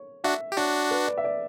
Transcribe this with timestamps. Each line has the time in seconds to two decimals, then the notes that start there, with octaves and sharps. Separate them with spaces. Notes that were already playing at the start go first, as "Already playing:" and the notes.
Already playing: C#5
0.24 D4 F#4 E5
0.52 G4
0.57 D4 F#4 C#5
0.91 B4
1.08 D5
1.17 E5
1.24 D5